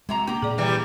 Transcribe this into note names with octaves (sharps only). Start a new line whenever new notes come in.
C3 F#3 G#3 A#5
A#3 D4 G4 A#5
A#2 G#4 D5
E3 G3